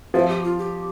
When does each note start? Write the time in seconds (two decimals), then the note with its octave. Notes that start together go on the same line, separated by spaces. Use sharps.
0.14 F3 E5
0.29 G4
0.44 F4
0.59 G4